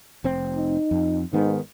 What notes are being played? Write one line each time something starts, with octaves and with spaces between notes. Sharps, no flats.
F1 C4
D#4
F2
G#2 D#3 B3